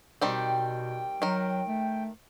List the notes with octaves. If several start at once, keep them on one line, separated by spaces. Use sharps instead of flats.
B2 D#3 G3 C4 G5
D#3 F#3 A#4
A3